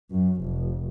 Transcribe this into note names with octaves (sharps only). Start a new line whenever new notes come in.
F#2
F1